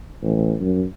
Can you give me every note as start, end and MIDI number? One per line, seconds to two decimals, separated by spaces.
0.23 0.55 33
0.61 0.84 42